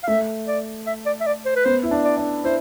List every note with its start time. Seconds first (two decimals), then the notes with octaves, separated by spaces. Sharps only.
0.03 F5
0.07 A3 E5
0.47 D5
0.87 E5
1.06 D5
1.21 E5
1.26 D5
1.46 C5
1.56 B4
1.65 B3 C5
1.83 E4
1.91 D4
2.04 D5
2.17 D4
2.44 E4 C5